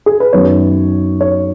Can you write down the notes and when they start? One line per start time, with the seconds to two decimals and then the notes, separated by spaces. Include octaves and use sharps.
0.06 G#4
0.20 B4
0.33 F#2 D#3 F#3 B3 C#5
1.21 C#5